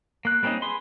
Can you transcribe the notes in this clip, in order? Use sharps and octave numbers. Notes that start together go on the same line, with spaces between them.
A#3 F#6
G3 A#3 C4 C#4 D#4
G#4 B4 C6